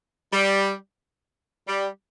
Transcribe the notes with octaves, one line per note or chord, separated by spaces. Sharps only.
G3
G3